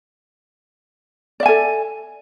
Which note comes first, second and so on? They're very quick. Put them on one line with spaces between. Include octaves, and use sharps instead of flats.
D5 E5 G#5 A4